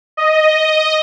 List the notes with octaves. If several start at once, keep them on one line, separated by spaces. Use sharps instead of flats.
D#5